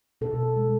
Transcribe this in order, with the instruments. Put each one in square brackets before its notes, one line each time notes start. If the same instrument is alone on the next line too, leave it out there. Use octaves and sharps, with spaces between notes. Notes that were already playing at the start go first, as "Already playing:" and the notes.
[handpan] B2 A4
G#3